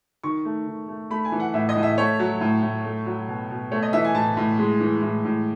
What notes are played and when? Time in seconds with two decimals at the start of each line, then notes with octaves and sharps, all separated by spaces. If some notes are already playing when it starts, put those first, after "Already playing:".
0.23 D#3 C#6
0.45 A3
0.67 D#3
0.89 A3
1.10 A3 B5
1.25 G#5
1.32 E3
1.40 F#5
1.54 A2 E5
1.69 D#5
1.76 A2
1.83 E5
1.98 A3 C#5
2.19 F#3
2.41 A2
2.62 A2
2.85 A3
3.06 F#3
3.28 B2
3.50 B2
3.72 A3 C#5
3.83 D#5
3.93 E3 E5
4.04 G#5
4.15 A2 A5
4.37 A2
4.59 G#3
4.80 E3
5.02 A2
5.25 A2